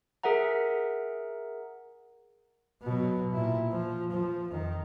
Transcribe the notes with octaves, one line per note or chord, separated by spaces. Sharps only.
G#4 A#4 E5 F#5 A#5
B2 F#3
A#2 E4
F3
F3
F2 D#3